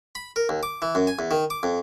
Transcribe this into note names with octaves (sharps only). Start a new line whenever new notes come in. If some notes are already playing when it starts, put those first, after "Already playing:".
B5
A#4
D#2
D6
E3
F#2
G#5
E2
D#3
D6
F2